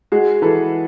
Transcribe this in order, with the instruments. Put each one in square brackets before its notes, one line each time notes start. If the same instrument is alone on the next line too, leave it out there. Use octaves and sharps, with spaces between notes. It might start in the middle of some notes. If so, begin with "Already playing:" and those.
[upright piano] G#3 F#4 G#4
E3 A4 B4